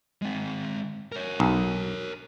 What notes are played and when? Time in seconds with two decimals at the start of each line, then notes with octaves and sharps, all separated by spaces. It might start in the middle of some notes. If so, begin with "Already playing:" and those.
0.22 G#3 C4
1.12 A#4 C#5
1.40 B1